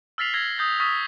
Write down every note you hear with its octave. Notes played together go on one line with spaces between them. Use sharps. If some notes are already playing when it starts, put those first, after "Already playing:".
E6 F6 A6 B6 C7 F7
E6 F6 G#6 A#6 C7 G7
D#6 G6 A6 A#6
C#6 D#6 F6 A6 B6